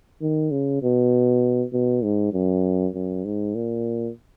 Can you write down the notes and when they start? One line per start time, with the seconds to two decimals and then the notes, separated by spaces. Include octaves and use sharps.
0.22 D#3
0.51 C#3
0.83 B2
1.73 B2
2.04 G#2
2.33 F#2
2.94 F#2
3.25 G#2
3.55 A#2